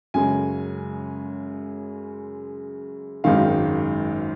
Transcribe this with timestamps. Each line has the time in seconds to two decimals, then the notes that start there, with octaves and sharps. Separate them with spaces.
0.14 F#2 C#3 G#3 G#5
3.24 G#1 F#2 D#3 G#3 F5